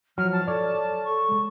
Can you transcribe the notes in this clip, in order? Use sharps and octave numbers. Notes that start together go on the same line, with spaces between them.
F3 F#3 F6
A5
A4 C#5 D5
A4 C#6
G#3